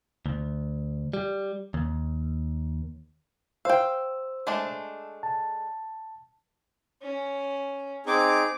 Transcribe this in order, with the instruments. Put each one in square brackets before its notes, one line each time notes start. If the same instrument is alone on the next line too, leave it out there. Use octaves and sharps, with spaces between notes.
[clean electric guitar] D2
G3
D#2
[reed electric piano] C5 E6 [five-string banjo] F5 G5
[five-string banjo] G#3 A3 D4
[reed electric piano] A5
[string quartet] C#4
[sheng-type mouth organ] C4 D#4 G#4 [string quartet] D6